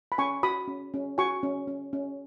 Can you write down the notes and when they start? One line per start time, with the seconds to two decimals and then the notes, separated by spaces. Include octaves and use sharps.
0.12 B5
0.18 C#4 G#5 C#6
0.43 F#4 B5 D#6
0.68 C#4
0.94 C#4
1.18 F#4 G#5 C#6
1.43 C#4
1.68 C#4
1.93 C#4